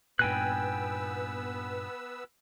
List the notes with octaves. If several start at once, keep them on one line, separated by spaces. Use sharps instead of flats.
G2 A#2 B3 B4 G5 G#5 E6 F#6